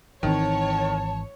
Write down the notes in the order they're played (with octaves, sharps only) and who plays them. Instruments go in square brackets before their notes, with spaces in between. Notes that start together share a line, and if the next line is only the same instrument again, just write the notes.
[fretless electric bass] G#1 E3 C4 [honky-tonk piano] D#3 [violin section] C#5 [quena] A5